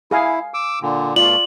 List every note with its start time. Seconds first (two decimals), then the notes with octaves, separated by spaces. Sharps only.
0.11 E4 G#4 F5 G#5
0.54 D6 E6
0.82 A#2 D3
1.16 B2 A3 F4 D5 F#7